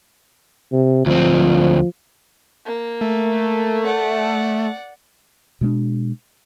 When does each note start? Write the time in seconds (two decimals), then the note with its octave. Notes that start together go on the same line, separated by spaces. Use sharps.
0.72 C3
1.06 D2 F3 C4
2.66 A#3
3.01 A3
3.86 D5 F#5
5.61 B2 G#3 B3 D4